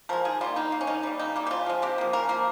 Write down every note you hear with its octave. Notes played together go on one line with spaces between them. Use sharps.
F3 G#3 A#4
D#3 G#4
G3 A#3 F4
D#3 D#4
A#3
C#4
D#3 D#4
G3 A#3
C#3 D#4
G3 A#3
G4
C#3 F4
F3 G#3
C3 G4
F3 A#3
C#3 A#4
F3 A#3 A#4